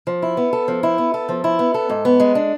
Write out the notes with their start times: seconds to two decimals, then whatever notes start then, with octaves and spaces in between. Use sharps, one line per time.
0.07 F3
0.22 E4
0.37 B3
0.53 A4
0.68 F3
0.83 E4
0.98 B3
1.14 A4
1.29 F3
1.44 E4
1.59 B3
1.74 A4
1.89 G#2
2.05 B3
2.20 G#3
2.35 D4